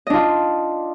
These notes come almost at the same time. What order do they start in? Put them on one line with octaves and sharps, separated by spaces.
D#5 D4 F4